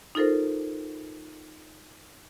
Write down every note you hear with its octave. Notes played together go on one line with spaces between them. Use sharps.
D#4 F4 A4 A#4 C5